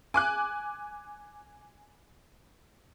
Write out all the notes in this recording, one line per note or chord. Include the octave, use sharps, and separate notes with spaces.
G#5 D6 F#6